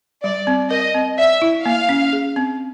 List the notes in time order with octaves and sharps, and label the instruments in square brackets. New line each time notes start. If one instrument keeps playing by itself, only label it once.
[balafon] G3 [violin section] D5
[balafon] C4
[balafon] A#4 [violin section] D#5
[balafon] C4
[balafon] D5 [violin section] E5
[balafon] E4
[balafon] A#3 [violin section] F5
[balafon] C#4
G#4
C4